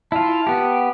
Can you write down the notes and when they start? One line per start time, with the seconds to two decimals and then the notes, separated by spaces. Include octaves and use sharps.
0.12 E4 F4 A5
0.47 B3 G4